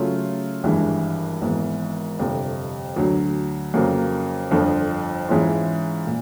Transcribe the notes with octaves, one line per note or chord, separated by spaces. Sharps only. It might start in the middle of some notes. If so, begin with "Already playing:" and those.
Already playing: C#3 F#3 A3 C#4 F4
G#1 G2 E3 G#3
G#1 G#2 E3 G#3 B3
G1 F2 C3
D2 D3 F#3
F2 C#3 F#3 A#3
G1 F2 D3 F3
G#2 E3 G#3 C#4 F4
A#2